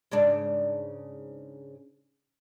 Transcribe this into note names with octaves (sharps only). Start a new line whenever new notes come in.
G#2 C#3 D4